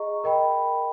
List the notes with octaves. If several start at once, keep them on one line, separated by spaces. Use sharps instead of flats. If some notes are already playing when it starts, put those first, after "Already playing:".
Already playing: G#4 D#5 A#5 C#6
A#4 D#5 G5 B5